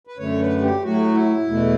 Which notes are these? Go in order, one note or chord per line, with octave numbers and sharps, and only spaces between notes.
B4
F#2 D3 A3 C#5
B4
G4
A2 F#3 A3 F#4
E4
E2 B2 A3